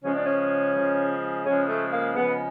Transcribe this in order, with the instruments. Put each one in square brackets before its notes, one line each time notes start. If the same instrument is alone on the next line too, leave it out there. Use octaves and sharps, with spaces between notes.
[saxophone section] C#3 F3 G#3 C#4
D4
C#4
C#3 F3 G#3
C#3 F3 G#3 C#4
A3
A#3
C#3 F3 G#3 B3